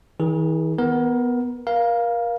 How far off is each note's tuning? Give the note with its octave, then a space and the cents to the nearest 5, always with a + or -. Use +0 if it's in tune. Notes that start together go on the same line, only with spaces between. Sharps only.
E3 -45 G#4 +5
B3 +0 A#4 +20
A#4 +30 F5 +0